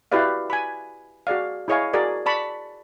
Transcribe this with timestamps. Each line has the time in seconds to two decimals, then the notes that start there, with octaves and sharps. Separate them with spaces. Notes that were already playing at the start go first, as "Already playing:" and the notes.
0.12 E4 F#4 G4 B4 D5 F5
0.50 G#5 B5
1.27 F#4 G#4 D5 F5
1.68 E4 G#4 C#5 D#5 F5 G#5
1.94 F#4 G#4 A#4 D5
2.26 D5 A5 B5 C#6